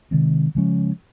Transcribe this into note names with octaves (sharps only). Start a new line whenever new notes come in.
C3 D#3 G#3 C4
C#3 F3 G#3 C#4